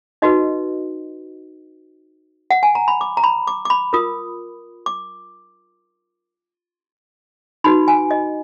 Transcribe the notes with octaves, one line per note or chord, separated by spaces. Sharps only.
D#4 F#4 B4 D#5
F#5
G#5
A#5
B5
D6
A#5
B5
D6
D6
B5
F4 A#4 D#6
D6
D#4 F#4 B4 B5
G#5
D#5